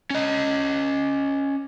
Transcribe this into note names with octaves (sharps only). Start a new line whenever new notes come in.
C#4 D#5